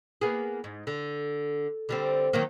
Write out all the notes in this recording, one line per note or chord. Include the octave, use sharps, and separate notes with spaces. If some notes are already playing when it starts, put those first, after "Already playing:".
A#3 B3 G#4
G#2
D3
D3 G3 C4
D#3 F#3 A#3